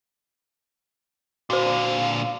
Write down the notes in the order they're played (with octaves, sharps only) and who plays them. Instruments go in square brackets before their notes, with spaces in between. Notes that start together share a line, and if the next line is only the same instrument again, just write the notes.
[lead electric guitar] A#2 D3 [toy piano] F#4 C5 [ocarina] F5